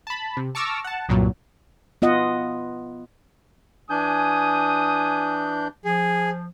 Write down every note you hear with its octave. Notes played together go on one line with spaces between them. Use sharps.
A5 B5
C3
A5 C#6 D6 E6 F6 A#6
F#5 A5
C2 G2 A#2 F#3
B3 F4 D#5 F#5
E3 D4 G#5 D#6 G6
F3 G#4